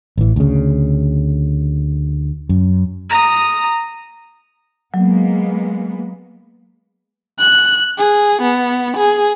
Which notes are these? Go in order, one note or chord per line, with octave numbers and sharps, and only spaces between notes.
A1 E3
D2 C#3
F#2
A#5 D#6
F#3 G#3 A#3 B3
F#6
G#4
B3
G#4